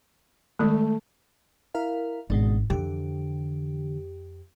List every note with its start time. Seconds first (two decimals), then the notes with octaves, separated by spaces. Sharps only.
0.59 D#3 G#3 A3
1.74 E4 A#4 F5
2.30 G#1 B2 G#3 D4
2.70 F2 D3 E3 G4